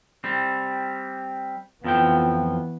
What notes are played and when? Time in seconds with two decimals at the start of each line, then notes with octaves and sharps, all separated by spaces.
0.24 G3 C4
1.84 F2 E3 F3 B3 G5